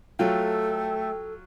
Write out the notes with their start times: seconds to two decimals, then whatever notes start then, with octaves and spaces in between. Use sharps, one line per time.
0.19 F#3 A3 F4 A4 G5